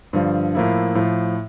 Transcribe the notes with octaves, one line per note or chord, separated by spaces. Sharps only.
G2 D3 F3
A2 F3 A#3 E4
A2 F3